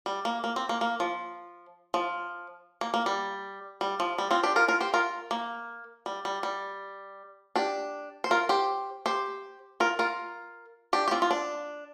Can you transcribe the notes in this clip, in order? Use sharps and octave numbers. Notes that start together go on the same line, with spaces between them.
G3
A#3
A#3
C4
A#3
A#3
F3
F3
A#3
A#3
G3
G3
F3
G3
C4 F4
D4 G4
F4 A#4
F4 A#4
G4 C5
F4 A#4
A#3
G3
G3
G3
D4 G4
C5
F4 A#4
G4 C5
G4 C5
F4 A#4
F4 A#4
D4 G4
G4
C4 F4
F4
D4